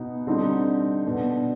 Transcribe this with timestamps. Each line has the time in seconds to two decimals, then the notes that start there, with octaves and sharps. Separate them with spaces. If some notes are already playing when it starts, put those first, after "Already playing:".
Already playing: B2 B3 D#4
0.27 D3 G3 C4 D#4
1.06 B2 B3 D4